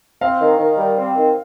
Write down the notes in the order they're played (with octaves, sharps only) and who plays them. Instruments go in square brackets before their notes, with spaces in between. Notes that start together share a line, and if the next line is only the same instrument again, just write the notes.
[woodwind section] C4 [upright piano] F5
[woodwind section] D#3
D#3
G3
C4
D#3